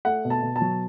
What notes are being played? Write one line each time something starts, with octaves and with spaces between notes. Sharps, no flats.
A3 F#5
B2
A5
B2
A5
F#3